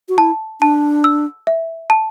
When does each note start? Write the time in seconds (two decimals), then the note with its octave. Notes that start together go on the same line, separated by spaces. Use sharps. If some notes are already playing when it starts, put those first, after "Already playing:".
0.09 F#4
0.18 E4 A5
0.61 D4 A5
1.04 E6
1.47 E5
1.90 A5